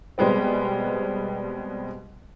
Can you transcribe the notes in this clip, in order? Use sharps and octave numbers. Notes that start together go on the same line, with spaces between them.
B2 G3 G#3 B3 C4